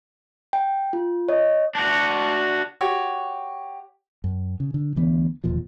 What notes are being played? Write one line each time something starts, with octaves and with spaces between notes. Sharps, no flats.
G5
F4
C#5 D#5
D4 F#4
F#4 G4 C#5
F#2
C#3
D3
D2 E3 B3
E1 D#2 A#2 F3